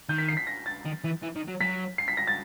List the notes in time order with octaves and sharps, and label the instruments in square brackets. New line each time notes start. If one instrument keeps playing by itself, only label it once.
[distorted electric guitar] D#3 [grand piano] G6
[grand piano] B6
C7
B6
A#6
A6
[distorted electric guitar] D#3
E3
E3
D#3
F#3
[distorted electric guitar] F#3 [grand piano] B6
[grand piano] C7
B6
A#6
A6